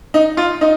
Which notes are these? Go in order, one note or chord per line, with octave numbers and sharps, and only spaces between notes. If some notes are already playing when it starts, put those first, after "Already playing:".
D#4
F4
D#4